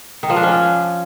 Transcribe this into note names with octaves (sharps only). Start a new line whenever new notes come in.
D#3
F3
D4
C#4